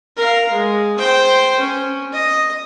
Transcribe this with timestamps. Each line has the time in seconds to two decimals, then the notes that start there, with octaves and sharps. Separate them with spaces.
0.16 A#4 F5
0.50 G#3
0.98 C5 G5
1.60 C#4
2.12 D#5